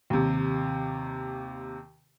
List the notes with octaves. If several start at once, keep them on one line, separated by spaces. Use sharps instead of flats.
D#2 C3